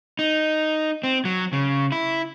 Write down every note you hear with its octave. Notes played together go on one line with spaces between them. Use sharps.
D#4
C4
F#3
C#3
E4